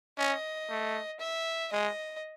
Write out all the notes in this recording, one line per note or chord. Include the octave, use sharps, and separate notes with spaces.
C#4 D#5
A3
E5
G#3 D#5